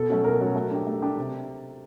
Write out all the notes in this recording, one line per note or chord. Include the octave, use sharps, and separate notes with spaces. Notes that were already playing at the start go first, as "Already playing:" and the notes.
Already playing: B2 A4
F#3 A3 C#4 F#4
B2 A#4
F#3 A3 C#4 F#4
A3
D4 G4
A3
D4 G4
C3